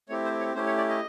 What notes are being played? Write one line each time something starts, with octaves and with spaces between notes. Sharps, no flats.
A3 C4 E4 G4 C#5
C5
C#5
A3 C#4 E4 G4 C5
C#5
D5
D#5